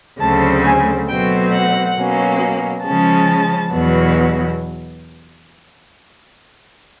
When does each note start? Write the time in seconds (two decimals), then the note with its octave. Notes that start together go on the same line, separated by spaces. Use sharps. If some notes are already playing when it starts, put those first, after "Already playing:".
0.21 D2 C#3 F#3 A3 C4 A5
0.65 G#5
1.08 B2 F#3 A3 C4 G5
1.52 F#5
1.97 B2 F#3 A#3 C#4
2.84 C#3 F3 G#3 C#4 A5
3.72 E2 B2 F#3 B3